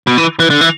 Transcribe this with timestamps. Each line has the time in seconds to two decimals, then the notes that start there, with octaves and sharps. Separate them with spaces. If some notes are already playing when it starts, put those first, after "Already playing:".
0.07 B2
0.18 E3
0.40 E3
0.50 D3
0.61 E3